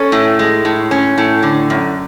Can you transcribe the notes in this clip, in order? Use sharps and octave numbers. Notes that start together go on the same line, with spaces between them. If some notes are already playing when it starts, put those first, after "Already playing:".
Already playing: C#4 A4 C#5
A2
G#3
A2
C#4
A2
D3
F#2